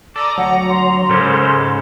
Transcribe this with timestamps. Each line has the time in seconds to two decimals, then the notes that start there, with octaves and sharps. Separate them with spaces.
0.16 A4 D5 A#5 D6 D#6
0.38 D2 F#3 F#5 A#5
0.69 C6
1.09 G#2 C#3 C#4 G4 A4 A#4 C5